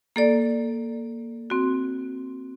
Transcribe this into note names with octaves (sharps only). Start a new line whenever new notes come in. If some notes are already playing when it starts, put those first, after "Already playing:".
A#3 A4 D5
C4 F#4